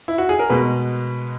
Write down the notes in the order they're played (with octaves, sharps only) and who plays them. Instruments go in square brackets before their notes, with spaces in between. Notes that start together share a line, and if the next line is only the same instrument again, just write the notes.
[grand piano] E4
F#4
G#4
A#4
B2 G#3 B4